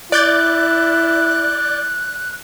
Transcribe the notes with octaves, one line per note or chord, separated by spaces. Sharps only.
E4 D5 F#6 G6 A6